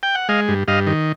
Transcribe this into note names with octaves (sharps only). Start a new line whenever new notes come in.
G5
F#5
G#3 D#5 F5
G2
G2 D#5 F5
D#3